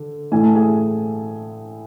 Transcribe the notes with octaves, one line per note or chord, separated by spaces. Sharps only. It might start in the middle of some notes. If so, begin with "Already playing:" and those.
Already playing: D3
A2 E3 A3 G#5
A5
G#4 G#5